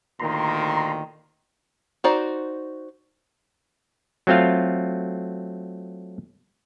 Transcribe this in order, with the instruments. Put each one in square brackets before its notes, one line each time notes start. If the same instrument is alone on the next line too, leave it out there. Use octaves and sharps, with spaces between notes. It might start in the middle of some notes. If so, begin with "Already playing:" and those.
[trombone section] D2 A#2 D#3 [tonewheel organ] A#5 C6
[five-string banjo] D#4 F#4 C5 D5
[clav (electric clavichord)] F#3 A3 C4 F4 F5